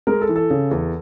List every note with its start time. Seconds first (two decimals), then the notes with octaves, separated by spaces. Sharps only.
0.07 G#3 A#4
0.21 A4
0.29 E3
0.36 A4
0.50 C#3
0.71 E2